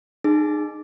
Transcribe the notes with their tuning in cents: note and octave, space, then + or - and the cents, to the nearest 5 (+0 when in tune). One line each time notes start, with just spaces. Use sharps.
D#4 -35 G#4 +0